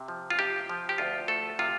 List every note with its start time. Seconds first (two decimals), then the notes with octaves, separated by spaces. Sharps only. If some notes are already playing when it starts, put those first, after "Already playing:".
Already playing: C3
0.08 F3
0.30 F4
0.39 C3 G4
0.69 F3
0.89 G4
0.98 D2 F4
1.28 A3 A4
1.59 C3 F4